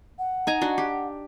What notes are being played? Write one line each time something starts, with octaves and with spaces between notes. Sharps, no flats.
F#5
D#4 G#5 A#5
D4 F#4
G4